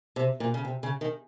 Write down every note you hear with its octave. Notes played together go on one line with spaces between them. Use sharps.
C3
A#2
C#3
C3
C#3
D#3